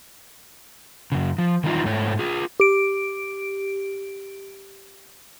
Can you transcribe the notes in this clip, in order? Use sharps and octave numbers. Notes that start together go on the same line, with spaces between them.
F#2 C#3
F3
D#3 E3 G3 D#4 F4
G#2 A3 C#5
F4 G#4
G4 D7